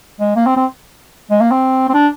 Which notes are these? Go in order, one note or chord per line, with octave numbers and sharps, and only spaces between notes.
G#3
A#3
C4
C4
G#3
A#3
C4
C4
D4